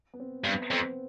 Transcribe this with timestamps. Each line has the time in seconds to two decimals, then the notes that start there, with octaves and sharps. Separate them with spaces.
0.14 B3
0.20 C4
0.44 G2 B3
0.61 B3
0.70 F2 C4